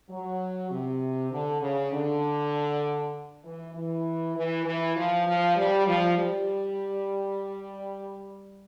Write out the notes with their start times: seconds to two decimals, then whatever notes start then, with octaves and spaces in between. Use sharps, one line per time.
0.10 F#3
0.71 C3
1.32 D3
1.62 C#3
1.93 D3
3.44 E3
3.75 E3
4.36 E3
4.65 E3
4.96 F3
5.27 F3
5.56 G3
5.87 F3
6.18 G3